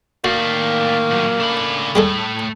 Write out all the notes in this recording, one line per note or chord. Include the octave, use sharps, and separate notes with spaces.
A2 D#3 A#3 F#4 D5 F5
A#2 F#3
C#3 A3 D4 B5
A2 G3 G#3 A4